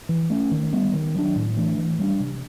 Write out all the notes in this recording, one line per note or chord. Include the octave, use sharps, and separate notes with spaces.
E3
A3 C#4
D#3
G3 B3
D#3
F#3 B3 D4
A2
E3 A3 D4
E3
G3 B3 D4
C3